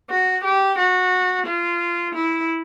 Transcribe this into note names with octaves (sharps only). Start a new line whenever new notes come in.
F#4
G4
F#4
F4
E4